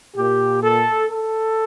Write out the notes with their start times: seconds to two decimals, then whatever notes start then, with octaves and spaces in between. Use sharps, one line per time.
0.15 A#2 G4
0.62 A4
1.10 A4